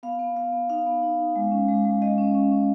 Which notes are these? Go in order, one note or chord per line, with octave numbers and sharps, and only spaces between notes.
B3 F5
B3
B3 F5
B3
D#4 F5
B3
D#4
D#4
G#3
C#4
G#3
G#3
G#3 D#5
C#4
C#4
C#4